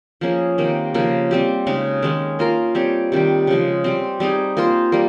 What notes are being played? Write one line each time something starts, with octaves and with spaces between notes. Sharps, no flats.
F3 A#3 C#4 G#4
C3 D#3 A#3
C#3 F3 A#3
G3 C4 G4
C#3 G#3 D#4
D#3 G#3 C#4
A#3 F4 A#4
G3 C4 G4 C#5
C3 D#3 G3
C#3 F3 G#3
C3 G3 C4
G3 C4 D#4 G#4
A#3 F4 C5
G3 A#3